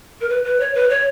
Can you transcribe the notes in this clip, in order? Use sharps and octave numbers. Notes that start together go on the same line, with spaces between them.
A#4
B4
B4
C#5
B4
C#5